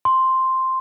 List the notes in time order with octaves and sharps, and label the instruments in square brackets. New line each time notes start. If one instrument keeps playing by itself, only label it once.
[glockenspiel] C6